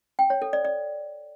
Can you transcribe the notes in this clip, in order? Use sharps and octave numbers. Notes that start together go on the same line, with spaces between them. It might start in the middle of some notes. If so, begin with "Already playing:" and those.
G5
C#5
A4
D5
D5